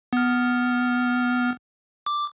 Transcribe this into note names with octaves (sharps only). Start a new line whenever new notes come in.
B3 F6
D6